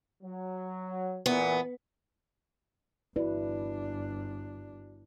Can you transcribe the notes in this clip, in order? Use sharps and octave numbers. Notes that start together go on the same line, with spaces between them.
F#3
E2 A#2 E3 B3
G1 D4 E4 F#4 B4 D5